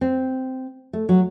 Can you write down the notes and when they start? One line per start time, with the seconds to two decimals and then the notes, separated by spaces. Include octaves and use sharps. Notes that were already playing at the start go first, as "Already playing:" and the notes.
0.01 C4
0.93 A3
1.09 F#3